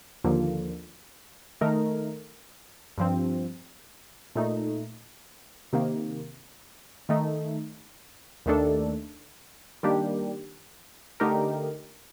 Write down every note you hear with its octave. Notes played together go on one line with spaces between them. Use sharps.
D#2 D3 F3 A#3
D#3 A3 D#4 A#4
G2 F3 C4
A#2 A3 D#4
C3 D#3 A#3
D#3 A3 D#4
D#2 D#3 A3 D4 A4
D#3 G3 A#3 D4 G4
D3 A3 D#4 G4 A#4